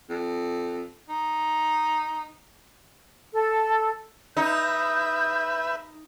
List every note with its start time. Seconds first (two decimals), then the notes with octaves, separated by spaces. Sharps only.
0.09 F2
1.09 D#4
3.33 A4
4.37 D#4 B4 E5 G6